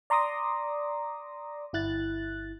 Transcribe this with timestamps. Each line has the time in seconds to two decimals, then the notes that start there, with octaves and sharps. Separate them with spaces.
0.10 D5 A#5 C6 D6 D#6 A#6
1.73 G1 E4 F#6 A6